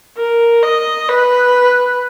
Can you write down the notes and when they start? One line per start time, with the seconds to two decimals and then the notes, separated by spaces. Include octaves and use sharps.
0.17 A#4
0.63 D#5
1.08 B4